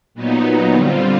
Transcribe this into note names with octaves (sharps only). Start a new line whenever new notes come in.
A#2 F#3 B3 D#4
D3 G3 C4 F4